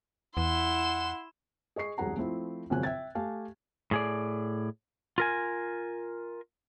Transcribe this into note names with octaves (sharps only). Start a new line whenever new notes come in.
E2 E4 F#5 C6 E7
G#4 D#5 C#6 C7
E1 C2 F#2 G#4 F#5 A#5
F3 A3 C4 E4
G#1 F2 C#3 F#3 G#5 F#6
E5 G5 G#6 A6
A3 G4 F5 G#5 A5
A2 G#4 D5
F4 A#4 G#5